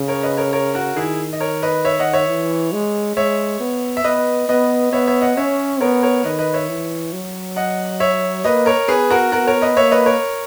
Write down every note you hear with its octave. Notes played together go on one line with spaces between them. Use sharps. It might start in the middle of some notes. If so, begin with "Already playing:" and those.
Already playing: C#3
A#4 C#5
B4 D#5
A#4 C#5
A#4 C#5
F#4 A#4
D#3 E4 G#4
D#5
A#4 C#5
B4 D#5
C#5 E5
D#5 F#5
C#5 E5
E3
G#3
G#3 C#5 E5
B3
E5
B3 B4 D#5
B3 B4 D#5
B3 C#5 E5
C#5 E5
D#5 F#5
C#4 C#5 E5
B3 A#4 C#5
A#4 C#5
D#3 B4 D#5
B4 D#5
C#5 E5
E3
F#3
D#5 F#5
C#5 E5
A#3 B4 D#5
A#4 C#5
B3 G#4 B4
F#4 A#4
B3 F#4 A#4
A#4 C#5
B4 D#5
A#3 C#5 E5
B4 D#5
A#4 C#5